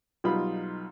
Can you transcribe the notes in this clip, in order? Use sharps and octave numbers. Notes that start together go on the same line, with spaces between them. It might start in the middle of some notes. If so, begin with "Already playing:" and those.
B1 G3 D#4 F4 B5